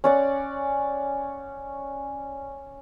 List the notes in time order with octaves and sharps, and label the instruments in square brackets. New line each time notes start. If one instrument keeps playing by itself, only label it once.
[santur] C#4 D5 F#5